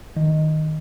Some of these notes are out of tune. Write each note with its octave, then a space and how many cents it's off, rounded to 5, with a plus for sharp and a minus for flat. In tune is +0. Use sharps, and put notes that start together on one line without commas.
D#3 +0